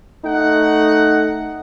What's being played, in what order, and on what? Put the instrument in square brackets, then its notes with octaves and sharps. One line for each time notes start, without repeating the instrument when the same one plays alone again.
[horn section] A3 D#4 F#5